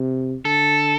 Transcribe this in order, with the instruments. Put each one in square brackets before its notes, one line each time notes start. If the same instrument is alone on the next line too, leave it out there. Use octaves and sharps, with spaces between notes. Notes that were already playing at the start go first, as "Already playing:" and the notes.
Already playing: [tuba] C3
[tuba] D3 [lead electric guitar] A4